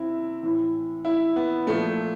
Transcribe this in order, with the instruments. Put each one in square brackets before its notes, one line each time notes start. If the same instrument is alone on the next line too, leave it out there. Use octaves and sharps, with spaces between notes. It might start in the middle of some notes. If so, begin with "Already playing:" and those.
Already playing: [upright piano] C3 C4 E4
A2 E3
E4
B3
A#2 F3 A3